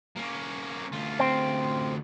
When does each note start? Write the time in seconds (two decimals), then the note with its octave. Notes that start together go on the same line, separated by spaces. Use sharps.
0.16 A#3 C#4
0.92 D2 F4
1.19 C4